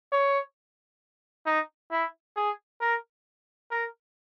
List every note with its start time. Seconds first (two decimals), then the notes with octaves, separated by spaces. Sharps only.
0.12 C#5
1.46 D#4
1.91 E4
2.36 G#4
2.81 A#4
3.71 A#4